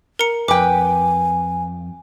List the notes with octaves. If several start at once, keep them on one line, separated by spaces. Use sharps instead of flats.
A#4 A#5 C#7
F2 B4 G5 G#5 D6